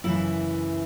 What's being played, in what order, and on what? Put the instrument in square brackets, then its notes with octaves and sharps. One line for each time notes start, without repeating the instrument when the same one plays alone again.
[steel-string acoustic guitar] F#2 C#3 E3 E4 E5